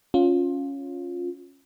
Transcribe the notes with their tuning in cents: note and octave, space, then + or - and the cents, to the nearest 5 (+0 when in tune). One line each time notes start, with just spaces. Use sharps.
C#4 +0 F4 +15